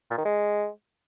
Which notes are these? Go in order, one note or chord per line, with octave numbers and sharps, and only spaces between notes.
A#2
D#3
G#3